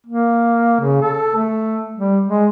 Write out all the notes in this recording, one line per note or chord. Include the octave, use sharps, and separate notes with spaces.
A#3
C#3
A4
A3
G3
G#3